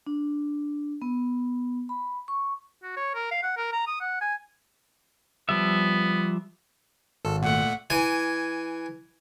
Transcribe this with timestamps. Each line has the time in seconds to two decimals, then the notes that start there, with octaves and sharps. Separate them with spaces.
0.07 D4
1.02 B3
1.89 B5
2.28 C#6
2.83 F#4
2.96 C#5
3.15 A#4
3.31 F5
3.43 F#5
3.57 A#4
3.72 A#5
3.87 D#6
4.01 F#5
4.21 G#5
5.49 F3 G3 B3 E5
7.25 G#1 A4
7.42 A#2 A3 F#5
7.90 E3 G#5